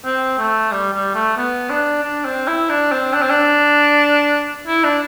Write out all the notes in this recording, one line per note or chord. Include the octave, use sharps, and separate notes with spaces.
C4
A3
G3
G3
A3
B3
D4
D4
C4
E4
D4
C4
D4
C4
D4
E4
D4